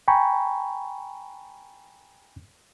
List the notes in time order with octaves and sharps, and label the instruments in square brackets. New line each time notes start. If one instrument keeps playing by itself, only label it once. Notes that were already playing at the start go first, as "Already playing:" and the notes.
[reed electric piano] G5 G#5 A#5 B5 C#6